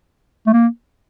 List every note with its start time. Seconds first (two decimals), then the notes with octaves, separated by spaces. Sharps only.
0.47 A3
0.53 A#3